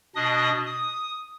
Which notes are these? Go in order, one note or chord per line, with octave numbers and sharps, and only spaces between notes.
B2 D4 D#5 D#6
D#6